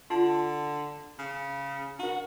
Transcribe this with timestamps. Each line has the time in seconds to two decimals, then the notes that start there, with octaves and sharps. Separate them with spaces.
0.10 D3 F4 A5
1.18 C#3
1.99 D4 F#4 A#4